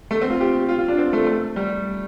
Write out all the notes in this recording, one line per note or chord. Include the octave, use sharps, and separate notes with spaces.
A3
C4
F4
G4
F4
F4
D4
C4
A3
A3
G3